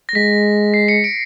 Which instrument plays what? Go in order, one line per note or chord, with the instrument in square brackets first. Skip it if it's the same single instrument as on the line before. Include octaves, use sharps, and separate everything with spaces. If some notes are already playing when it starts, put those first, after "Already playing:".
[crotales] A#6
[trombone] G#3 [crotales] B6
[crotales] C7
C#7
D7